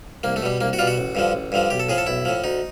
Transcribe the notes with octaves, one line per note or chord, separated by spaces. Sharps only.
C2 A#3
A3
B2 G3
C2 A#3
F#4
B2 G3 F4
F#4
A1
G2 D3 F3
A1
G2 D3 F3
B1 G4
A4
A2 F3 G#4
A4
B1 E4
A2 F3
D2 D#4